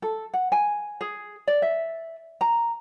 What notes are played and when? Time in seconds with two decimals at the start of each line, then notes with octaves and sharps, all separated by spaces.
0.02 A4
0.34 F#5
0.52 G#5
1.01 G#4
1.47 D5
1.62 E5
2.41 A#5